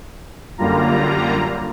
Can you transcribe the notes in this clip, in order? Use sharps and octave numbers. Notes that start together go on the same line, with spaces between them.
F#2 D3 G3 A#3 F4 A#5